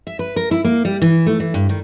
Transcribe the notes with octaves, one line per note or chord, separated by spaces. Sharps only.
E5
B4
A#4
E4
A#3
G3
E3
A3
E3
G2
D#3